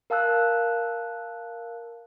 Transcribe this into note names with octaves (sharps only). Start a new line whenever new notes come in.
A#4 F5 A5 E6 F#6